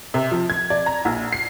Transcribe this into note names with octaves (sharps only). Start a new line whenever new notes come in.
C3
F3
G#6
D5
A#5
A#1
C7